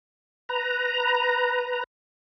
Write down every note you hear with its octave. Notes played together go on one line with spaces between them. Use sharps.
B4 A#5